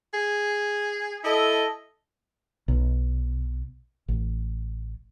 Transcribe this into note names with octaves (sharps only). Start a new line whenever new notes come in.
G#4
E4 A4 D#5
B1
A1